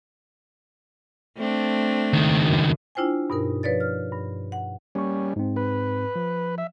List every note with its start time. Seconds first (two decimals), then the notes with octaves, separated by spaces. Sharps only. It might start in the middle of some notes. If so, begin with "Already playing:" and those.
1.37 A3 C4 D4
2.13 C#2 D#3
2.45 F#2
2.95 D4 E4 F4 C5 G5 G#5
3.30 G2 B2 D#4 A#4
3.63 F3 B4 C#5 D5 A6
3.80 F6
4.12 G2
4.52 F#5
4.95 G3 A#3 C#4 C#6
5.36 G#2 C4
5.56 B4
6.16 F3
6.58 E5